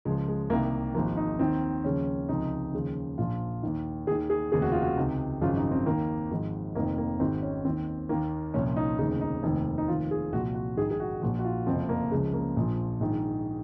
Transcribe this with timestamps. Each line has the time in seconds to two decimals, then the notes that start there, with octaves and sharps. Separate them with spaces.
0.05 C#2 C#3 F3 G#3
0.28 G#3
0.50 C2 C3 D#3 A#3
0.94 G#1 G#2 F3 A#3
1.17 D#4
1.39 D#2 D#3 C4
1.84 D#2 C#3 F3 C#4
2.29 C#2 C3 F3 D#4
2.73 D#2 C#3 F3
3.18 A#1 A#2 F3 F4
3.63 D#2 D#3
4.07 D#2 G#4
4.12 D#3
4.30 G#4
4.52 F1 D#2 C#3 G#4
4.62 F#4
4.72 F4
4.82 F#4
4.97 C#2 C3 D#3
5.41 G#1 F#2 C#3 F3 F4
5.56 D#4
5.71 C4
5.86 D#2 D#3 A#3
6.31 G#1 G#2 F3
6.75 F1 F2 D#3 A#3
6.98 A#3
7.20 G#1 G#2 D#3 C4
7.42 C#4
7.65 D#2 D#3 C4
8.09 D#2 D#3 A#3
8.54 C2 A#2 F3 C#4
8.76 D#4
8.99 F1 D#2 C#3 D#4
9.21 D#4
9.43 F1 D#2 D#3
9.78 D#4
9.88 F1 D#2 D#3 F4
10.11 G#4
10.32 C2 A#2 F3 F#4
10.55 F#4
10.77 A#1 G#2 D#3 G#4
10.91 G#4
11.00 F#4
11.22 A#1 A#2 F3 F#4
11.39 F#4
11.44 F4
11.66 F#1 F2 C3 F3 C4
11.89 A#3
12.12 C#2 C#3 F3 G#3
12.33 A#3
12.57 A#1 A#2 F3
13.00 A#1 G#2 D#3